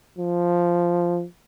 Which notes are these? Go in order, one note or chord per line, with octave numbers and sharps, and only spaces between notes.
F3